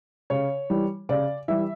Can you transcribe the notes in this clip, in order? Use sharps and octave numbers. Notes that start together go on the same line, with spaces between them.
C#3 C#5
E3 G3
C#3 D5
E3 G3 E5